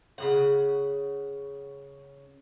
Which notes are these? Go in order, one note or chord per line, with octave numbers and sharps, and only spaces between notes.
C#3 G#3 F#5